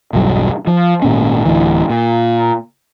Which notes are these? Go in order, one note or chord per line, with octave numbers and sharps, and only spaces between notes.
E1 B1 G2 F#3
F3
G#1 A#2 C#4
D1 D2 E3
A#2